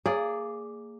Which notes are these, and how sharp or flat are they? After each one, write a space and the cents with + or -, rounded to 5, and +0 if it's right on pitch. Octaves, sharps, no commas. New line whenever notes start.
A#3 -25 G#4 +0 D5 +0